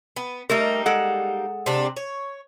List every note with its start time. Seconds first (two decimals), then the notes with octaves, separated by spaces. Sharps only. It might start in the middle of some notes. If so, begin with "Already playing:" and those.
0.16 B3
0.50 G3 A3 A#3 D#4 A#4
0.86 G#3 A4 F#5
1.66 C3 C4 D4
1.96 C#5